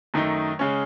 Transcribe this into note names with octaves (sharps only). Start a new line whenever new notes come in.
F#2 D#3 A3 D#4
C#3 G#3 C#4